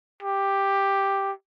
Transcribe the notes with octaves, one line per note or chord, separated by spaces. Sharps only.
G4